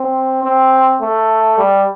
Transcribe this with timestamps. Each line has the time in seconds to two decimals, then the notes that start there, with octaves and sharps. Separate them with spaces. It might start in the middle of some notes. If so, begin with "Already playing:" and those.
Already playing: C4
0.44 C4
1.02 A3
1.59 G3